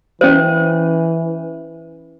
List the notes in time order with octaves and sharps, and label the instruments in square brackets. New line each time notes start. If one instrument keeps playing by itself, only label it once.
[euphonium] E3 [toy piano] C#4 C5